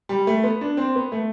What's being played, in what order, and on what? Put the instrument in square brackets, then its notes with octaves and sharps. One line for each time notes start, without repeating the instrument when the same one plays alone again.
[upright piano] G3
A3
B3
D4
C4
B3
A3